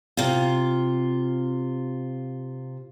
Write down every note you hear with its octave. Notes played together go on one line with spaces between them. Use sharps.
C3 F4